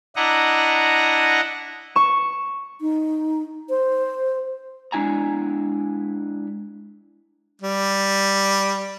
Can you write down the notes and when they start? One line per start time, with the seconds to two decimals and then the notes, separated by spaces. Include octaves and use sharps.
0.16 D4 E4 D#5 F#5 A#5
1.96 C#6 E7
2.81 D#4
3.70 C5
4.92 G#3 D4 E4 G#5 A#5
7.62 G3